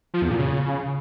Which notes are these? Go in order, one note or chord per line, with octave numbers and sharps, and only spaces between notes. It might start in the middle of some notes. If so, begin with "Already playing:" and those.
F3
E2
A#2
C#3